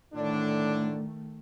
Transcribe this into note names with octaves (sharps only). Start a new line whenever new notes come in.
A2 D3 D#3 A3 D4